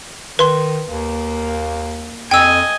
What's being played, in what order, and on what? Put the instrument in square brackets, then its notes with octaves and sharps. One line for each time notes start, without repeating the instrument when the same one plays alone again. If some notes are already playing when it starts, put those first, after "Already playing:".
[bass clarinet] D#3 [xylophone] B4 C6
[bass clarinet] D#2 [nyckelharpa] A#3
[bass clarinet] F2 [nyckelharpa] D#5 G#5 [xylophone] G5 E6